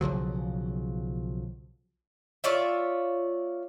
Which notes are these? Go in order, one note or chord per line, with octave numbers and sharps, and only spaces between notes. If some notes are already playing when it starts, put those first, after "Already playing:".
B1 C#3 F3 F#3
F4 C#5 D5 E5